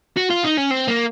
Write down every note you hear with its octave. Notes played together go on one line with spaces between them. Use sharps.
F#4
F4
D#4
C#4
C4
A#3